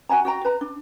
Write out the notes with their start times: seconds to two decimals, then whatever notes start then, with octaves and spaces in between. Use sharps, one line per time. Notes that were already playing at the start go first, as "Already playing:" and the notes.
0.09 F#4 F#5 G#5 A#5
0.25 F#4 G5 A#5
0.45 B4 A#5
0.61 D4